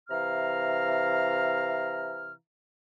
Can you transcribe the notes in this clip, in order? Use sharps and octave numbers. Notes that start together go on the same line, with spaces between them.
C3 E3 F5 A#5 F6